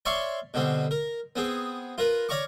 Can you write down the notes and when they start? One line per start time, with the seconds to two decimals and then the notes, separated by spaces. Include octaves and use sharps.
0.05 C#5 D5 E5 F5 C6 C#6
0.54 B2 D3 G3 C4
0.91 A#4
1.36 B3 C4 G#4
1.98 F4 A#4 B4
2.29 C#5 D5 F5 A#5 C#6 D6